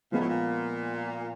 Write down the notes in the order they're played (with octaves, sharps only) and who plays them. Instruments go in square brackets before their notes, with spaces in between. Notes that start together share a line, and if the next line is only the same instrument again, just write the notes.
[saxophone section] A#2 [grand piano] F3 G#3 B3
[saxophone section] A2
A#2